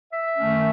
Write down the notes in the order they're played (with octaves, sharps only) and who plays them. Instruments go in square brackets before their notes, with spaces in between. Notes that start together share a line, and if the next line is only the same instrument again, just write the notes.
[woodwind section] E5
F#2 D#3 A3 C#4